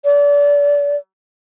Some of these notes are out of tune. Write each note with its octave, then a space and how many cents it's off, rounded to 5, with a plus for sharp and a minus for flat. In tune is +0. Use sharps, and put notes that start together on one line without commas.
D5 -30